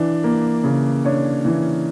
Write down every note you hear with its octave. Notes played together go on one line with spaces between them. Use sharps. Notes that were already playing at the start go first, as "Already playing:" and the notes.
Already playing: E3 D4
A#3
C#3
D4 C#5
E3